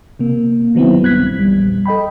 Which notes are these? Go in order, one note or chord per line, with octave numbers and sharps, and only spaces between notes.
C3 A#3
D#3 F#3 B3 C4 E4
A#1 G2 F#6 G#6 B6
A#1 E2 G3
A4 D#5 G5 B5